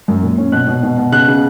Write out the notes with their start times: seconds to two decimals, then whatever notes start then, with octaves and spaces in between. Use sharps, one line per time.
0.08 F#2
0.22 A#2
0.38 C#4
0.52 B2 F#6
0.67 B2
0.83 B2
0.98 B2
1.12 C#3 F#6
1.28 C#3